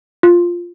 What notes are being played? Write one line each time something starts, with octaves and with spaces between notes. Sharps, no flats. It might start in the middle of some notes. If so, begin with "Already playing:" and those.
F4